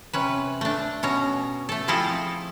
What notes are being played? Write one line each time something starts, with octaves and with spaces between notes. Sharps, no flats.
C3 C#4 B4
A3 D4
B2 C#4 A#5
A3 A4
F3 C4 E4 F4 G#4 A4